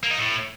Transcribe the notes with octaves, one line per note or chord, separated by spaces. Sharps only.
A#3
D#4
A2